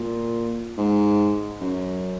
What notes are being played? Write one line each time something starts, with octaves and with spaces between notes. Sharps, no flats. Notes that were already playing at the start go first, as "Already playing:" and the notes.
Already playing: A#2
G#2
F#2